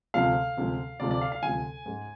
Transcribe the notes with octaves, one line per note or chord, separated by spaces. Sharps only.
D2 C3 F3 G#3 F5
D2 C3 F3 G#3
D2 C3 F3 G#3 D5
D5
F5
F5
D2 C3 F3 G#3 G#5
G#2 G#3